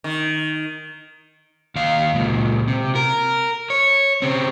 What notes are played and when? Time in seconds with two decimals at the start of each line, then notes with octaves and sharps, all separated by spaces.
0.04 D#3
1.76 D#2 F5
2.15 C#2 A#2
2.68 C3
2.95 A#4
3.70 C#5
4.22 C#3 C4